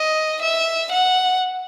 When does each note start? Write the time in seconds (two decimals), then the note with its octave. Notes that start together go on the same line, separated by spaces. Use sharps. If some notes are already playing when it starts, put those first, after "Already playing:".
Already playing: D#5
0.42 E5
0.91 F#5